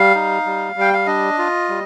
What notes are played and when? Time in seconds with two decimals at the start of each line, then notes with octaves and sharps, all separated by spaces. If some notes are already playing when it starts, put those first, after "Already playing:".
Already playing: G3 F5
0.15 D#4
0.46 G3
0.76 G3 G5
0.93 F5
1.06 D4 D#5
1.38 F4
1.69 G3